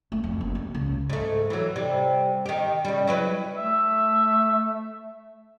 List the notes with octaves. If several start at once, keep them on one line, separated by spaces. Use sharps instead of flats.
A3
F2
F#1
D#2
C#2
G#2 A3
E3 F#3
C3 G3
D#3 G4
C#3 G3
F#3 E4 B4
A3 E5